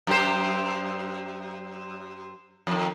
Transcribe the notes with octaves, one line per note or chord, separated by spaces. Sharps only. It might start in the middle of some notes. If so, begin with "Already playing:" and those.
F#2 G4 C5
F2 D#3